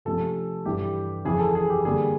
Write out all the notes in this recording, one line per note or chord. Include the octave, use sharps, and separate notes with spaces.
C3 F3 A3 C#4 A4
G2 E3 G3 G4
F2 C#3 E3 G#4
A4
G#4
G4
D3 G3 A#3 G#4